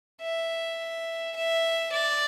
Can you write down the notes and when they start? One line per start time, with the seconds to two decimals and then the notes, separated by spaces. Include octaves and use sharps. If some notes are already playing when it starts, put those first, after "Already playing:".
0.21 E5
1.36 E5
1.92 D5